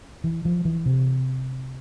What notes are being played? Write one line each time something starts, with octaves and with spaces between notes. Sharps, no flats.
E3
F3
E3
C3